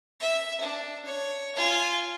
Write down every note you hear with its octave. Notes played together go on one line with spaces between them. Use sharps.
E5
D4
C#5
F4 G#5